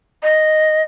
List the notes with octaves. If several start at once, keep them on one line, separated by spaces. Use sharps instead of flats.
D#5